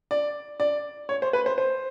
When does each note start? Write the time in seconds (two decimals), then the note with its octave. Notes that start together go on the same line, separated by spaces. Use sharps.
0.11 D5
0.60 D5
1.09 C#5
1.22 C5
1.33 B4
1.46 C5
1.58 C5